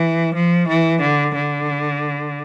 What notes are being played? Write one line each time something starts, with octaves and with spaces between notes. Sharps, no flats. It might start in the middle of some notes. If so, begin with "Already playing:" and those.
Already playing: E3
F3
E3
D3
D3